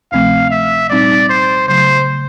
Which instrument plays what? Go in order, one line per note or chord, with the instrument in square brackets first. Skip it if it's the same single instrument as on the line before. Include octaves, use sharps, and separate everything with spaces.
[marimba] D2 C3 F3 A3 C4 [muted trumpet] F5
[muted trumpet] E5
[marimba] A#2 G3 C4 D#4 [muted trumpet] D5
[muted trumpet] C5
[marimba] C#3 F#3 A3 [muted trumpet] C5